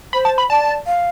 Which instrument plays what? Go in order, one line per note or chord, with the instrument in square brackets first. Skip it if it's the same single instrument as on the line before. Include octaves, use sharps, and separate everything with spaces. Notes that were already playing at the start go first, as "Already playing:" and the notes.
[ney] C5 [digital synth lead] B5
[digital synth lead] A5
B5
[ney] D5 [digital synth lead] A5
[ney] F5